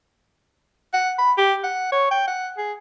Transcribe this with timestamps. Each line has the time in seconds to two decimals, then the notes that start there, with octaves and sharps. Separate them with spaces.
0.93 F#5
1.18 B5
1.38 G4
1.63 F#5
1.92 C#5
2.11 G5
2.27 F#5
2.58 G#4